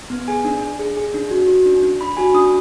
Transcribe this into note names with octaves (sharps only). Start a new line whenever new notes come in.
B3
G#4 G#5
D4
D4
G#4
G#4
D4
F#4
F#4
D4
D4
D4 B5
F#4 G#5
D4 D#6